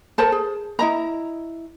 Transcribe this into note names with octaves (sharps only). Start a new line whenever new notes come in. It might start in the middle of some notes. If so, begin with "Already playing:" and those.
A4 A#4 C5 A5
G#4
E4 D#5 A#5